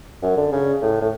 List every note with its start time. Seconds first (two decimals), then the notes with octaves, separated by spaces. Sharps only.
0.23 F#2
0.37 D3
0.52 C#3
0.82 A2
1.01 A2